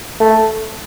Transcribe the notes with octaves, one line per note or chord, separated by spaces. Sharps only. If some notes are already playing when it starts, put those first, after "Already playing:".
A3